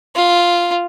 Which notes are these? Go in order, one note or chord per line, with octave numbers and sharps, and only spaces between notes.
F4